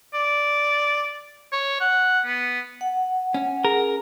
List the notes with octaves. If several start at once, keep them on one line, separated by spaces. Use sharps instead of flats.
D5
C#5
F#5
B3
F#5
C#4
G#4 A#4